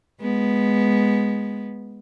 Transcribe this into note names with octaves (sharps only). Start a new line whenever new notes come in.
G#3 B3